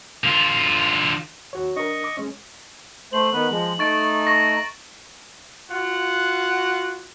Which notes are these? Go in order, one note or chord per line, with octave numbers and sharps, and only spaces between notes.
D3 F4
D#2 F#4 C#5
D4 A#4 D#5 C#6
D6
G#3 C#4
A3 C5 F#7
D#3 B3 B4
F3 G#3
A3 D#4 C#6 A6 D7
C#6 A#6
F4 F#4 F#5